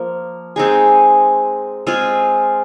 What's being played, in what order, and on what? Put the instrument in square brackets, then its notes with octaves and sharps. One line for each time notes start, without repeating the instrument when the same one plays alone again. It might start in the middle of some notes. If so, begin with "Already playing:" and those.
Already playing: [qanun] F3 A#3
G#3 C4 D#4 G#4
G#3 C4 F4 G#4